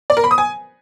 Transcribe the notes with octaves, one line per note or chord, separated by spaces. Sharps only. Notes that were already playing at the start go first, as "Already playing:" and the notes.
D5
A#4
B5
D#6
G#5